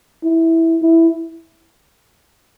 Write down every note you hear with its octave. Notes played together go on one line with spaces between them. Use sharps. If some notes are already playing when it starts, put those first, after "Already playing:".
E4
E4